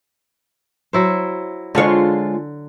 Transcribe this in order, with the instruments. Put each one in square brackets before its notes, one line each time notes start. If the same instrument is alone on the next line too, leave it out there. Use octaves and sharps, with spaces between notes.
[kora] F#3 E4 C5
[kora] D3 [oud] G#3 F4 C#5